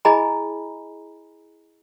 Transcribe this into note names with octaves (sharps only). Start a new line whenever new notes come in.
E4 G#4 D#5 G#5 A#5 B5